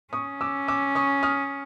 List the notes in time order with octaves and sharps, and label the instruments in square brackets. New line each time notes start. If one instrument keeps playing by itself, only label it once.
[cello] C#4 [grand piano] C#6 D#6
[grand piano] D6 E6
D6 E6
C#6 D#6
D#6 F6